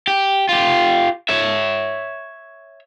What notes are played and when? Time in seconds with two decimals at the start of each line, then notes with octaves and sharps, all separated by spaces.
0.07 G4
0.49 F4 G4
1.29 C#5 E5